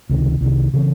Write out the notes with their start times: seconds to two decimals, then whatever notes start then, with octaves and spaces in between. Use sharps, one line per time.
0.09 C#2 C3 D#3
0.41 C2 C3 D#3
0.74 C#3 E3 C4